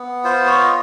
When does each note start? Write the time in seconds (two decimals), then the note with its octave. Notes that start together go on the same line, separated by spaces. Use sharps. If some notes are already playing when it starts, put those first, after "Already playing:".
Already playing: B3
0.24 F4 C5
0.46 C#5
0.64 D#5